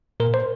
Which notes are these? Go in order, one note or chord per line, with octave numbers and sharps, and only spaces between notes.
A#2 A#4
C5